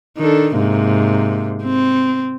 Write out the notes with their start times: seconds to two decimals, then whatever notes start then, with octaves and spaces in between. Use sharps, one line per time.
0.17 D#3 D4 A4
0.57 G#2 C3 A#3
1.63 C4